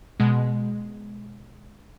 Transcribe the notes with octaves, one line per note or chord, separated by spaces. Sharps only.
B2 G#3